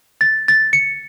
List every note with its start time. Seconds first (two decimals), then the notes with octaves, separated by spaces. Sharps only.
0.21 A6
0.48 A6
0.73 C#7